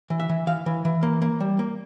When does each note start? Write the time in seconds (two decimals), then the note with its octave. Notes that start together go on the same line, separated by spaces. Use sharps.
0.10 E3
0.20 E5
0.29 E3
0.47 E3 F5
0.66 E3
0.85 E3
1.03 A#3
1.22 A#3
1.40 G3
1.59 A#3